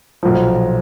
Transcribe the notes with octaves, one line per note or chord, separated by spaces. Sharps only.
B1 A#2 F3